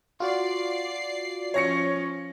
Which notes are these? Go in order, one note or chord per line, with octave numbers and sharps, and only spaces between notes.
F4 F#4 D5 C7
F3 C#4 C#5 A#6 C#7